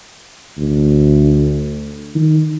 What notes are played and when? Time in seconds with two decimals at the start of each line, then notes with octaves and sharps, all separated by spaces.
0.58 D2
2.15 D#3